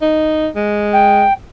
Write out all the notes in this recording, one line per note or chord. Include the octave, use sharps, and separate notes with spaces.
D#4
G#3
G5